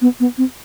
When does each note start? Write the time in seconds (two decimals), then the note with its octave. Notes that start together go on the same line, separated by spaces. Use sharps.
0.01 B3
0.20 B3
0.38 C4